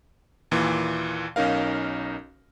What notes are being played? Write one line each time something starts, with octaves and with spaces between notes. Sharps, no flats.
D#2 A#2 E3
B1 C#4 D#4 A#4 F5